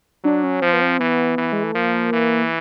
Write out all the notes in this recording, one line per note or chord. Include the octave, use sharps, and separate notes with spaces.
F#3 D4
C#4
F3 C4
B3
C4
E3 B3
E3
G#3
A3
F3 A#3
E3